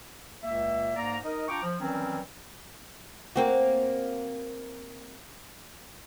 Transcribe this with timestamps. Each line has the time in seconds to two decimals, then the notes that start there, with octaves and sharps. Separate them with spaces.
0.43 C#2 A#2 A#3 E5
0.96 G#2 A#3 D5 A#5
1.24 D#4 A#4 D#5
1.48 D4 F4 G5 A#5 C#6 D6
1.63 F3
1.80 D#3 E3 F#3 G3 C4 C#4
3.36 A#3 C4 F#4